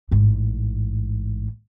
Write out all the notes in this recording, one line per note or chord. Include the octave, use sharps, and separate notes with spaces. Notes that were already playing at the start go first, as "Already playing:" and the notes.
A1 G#2